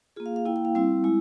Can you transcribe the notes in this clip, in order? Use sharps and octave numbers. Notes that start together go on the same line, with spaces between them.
A#3 F4 G#4
F5
F5
A#3 E4 G5
G5
F5
G3 C4 E4
G#3 E4